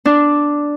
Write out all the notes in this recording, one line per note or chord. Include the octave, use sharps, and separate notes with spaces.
D4